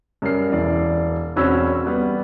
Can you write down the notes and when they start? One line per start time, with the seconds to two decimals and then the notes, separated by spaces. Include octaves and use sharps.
0.22 F#2 G3 A#4 C7
0.52 E1 E3 D5
1.36 E1 C4 C#4 F#4 B5 E6
1.86 G3 B3